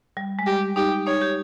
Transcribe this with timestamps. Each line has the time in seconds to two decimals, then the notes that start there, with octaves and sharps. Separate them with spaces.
0.17 G3
0.39 G#3
0.47 G3 G4
0.76 D#4 G4
1.07 D#4 C#5
1.22 G4